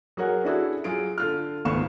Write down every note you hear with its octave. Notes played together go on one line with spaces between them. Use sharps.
F#3 F#4 G#4 A#4 C#5 F#5
C#4 D4 E4 F#4 G#4 A4
F#3 F4 G#4 D7
D3 F4 F6
G#1 C#2 A3 B3 C#6 E7